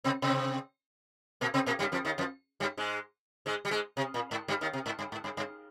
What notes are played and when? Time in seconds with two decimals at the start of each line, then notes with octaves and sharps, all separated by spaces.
0.04 C3 C4
0.22 C3 C4
1.41 A#2 A#3
1.54 C3 C4
1.66 A#2 A#3
1.79 G2 G3
1.92 F2 F3
2.05 D#2 D#3
2.18 F2 F3
2.60 G2 G3
2.77 G#2 G#3
3.46 G#2 G#3
3.65 G3
3.71 G#2 G#3
3.97 C3
4.14 A#2
4.31 G#2
4.48 G2 G3
4.61 D#2 D#3
4.73 C3
4.86 G#2
4.99 G2
5.12 G#2
5.24 G2
5.37 G2